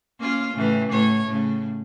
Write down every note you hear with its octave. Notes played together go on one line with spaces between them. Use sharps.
A#3 C#4 F4
A2 C#3 E3
A2 C#5
A2 C#3